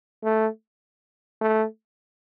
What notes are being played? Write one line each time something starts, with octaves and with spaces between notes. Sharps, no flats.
A3
A3